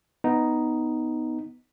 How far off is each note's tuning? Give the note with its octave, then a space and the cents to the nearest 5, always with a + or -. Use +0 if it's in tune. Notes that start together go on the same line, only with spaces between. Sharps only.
B3 +5 D#4 +0